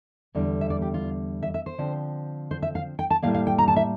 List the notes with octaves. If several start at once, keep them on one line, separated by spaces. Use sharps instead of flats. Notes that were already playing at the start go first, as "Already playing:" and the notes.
E2 D3 G3
E5
D5
G4
F4
E5
E5
C5
D3 F3 C4
C5
E5
F5
G5
A5
A2 G3 A#3 F5
F5
G5
A#5
A5
E5